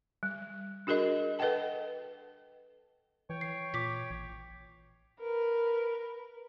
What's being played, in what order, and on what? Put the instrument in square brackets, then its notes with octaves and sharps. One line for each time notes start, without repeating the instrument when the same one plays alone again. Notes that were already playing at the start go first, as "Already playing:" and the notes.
[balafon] G3
D4 F#4 G#4 A#4 D#5
A4 B4 D#5 F#5 G5 A5
[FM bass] E3 [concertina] C#5 G5 C#6
[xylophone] C7
[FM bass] A#2 [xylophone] D6 B6
[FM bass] A1
[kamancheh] A#4 B4